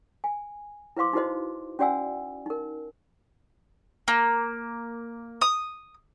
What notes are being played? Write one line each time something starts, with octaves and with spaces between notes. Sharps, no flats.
G#5
E4 B4 C5 F5 C6 D6
D#4 E4 F#4 B4 C5 D#5
C#4 F#4 D5 F#5 G#5 E6
D#4 A#4
A#3
D#6